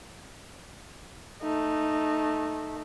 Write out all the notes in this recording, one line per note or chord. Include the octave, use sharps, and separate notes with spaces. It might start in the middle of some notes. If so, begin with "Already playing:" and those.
A3 D#4